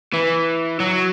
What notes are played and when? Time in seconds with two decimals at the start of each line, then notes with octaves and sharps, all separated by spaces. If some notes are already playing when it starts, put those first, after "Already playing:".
0.14 E3
0.80 F#3